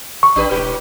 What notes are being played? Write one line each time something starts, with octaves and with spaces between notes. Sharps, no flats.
C#6
A1 D4 G4 B4
E1 G#2 G4 B4